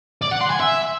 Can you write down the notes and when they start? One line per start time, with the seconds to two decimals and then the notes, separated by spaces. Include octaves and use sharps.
0.22 D5
0.32 F#5
0.41 C6
0.51 G#5
0.60 E5